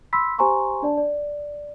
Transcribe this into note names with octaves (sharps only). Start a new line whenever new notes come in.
B5 C6 E6 B6
G4 C5 G#5 A#5 C6 C#6
D4 D5 A5
D5